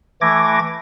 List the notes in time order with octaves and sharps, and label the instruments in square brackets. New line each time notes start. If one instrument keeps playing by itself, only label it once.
[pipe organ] E3 A3 D6 G#6 A#6